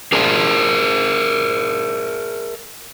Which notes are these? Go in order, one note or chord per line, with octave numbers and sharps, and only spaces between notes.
G#4 A#4 D5 E5 G5 A5